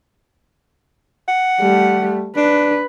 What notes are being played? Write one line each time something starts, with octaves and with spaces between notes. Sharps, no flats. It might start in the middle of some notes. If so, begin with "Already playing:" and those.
F#5
G3 A3
D4 B4